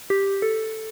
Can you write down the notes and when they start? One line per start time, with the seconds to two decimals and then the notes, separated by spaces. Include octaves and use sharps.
0.10 G4
0.42 A4